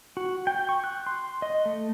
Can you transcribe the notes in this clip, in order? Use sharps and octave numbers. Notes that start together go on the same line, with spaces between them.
F#4
G5
C#6
F#6
C6
D#5
A3